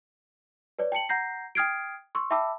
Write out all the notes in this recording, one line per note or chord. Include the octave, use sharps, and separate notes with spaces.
B4 C#5 D5
G5 A5 C#7 F#7
F#5 A#5 G6 A#6 C7
G5 D#6 F6 G#6 C7 D7
C6 C#6 E6
E5 G5 A5 B5 D6 E6